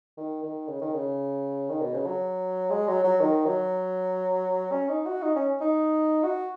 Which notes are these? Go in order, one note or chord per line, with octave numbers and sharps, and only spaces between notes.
D#3
D#3
C#3
D#3
C#3
D#3
B2
C#3
F#3
G#3
F#3
F#3
D#3
F#3
C#4
D#4
F#4
D#4
C#4
D#4
F#4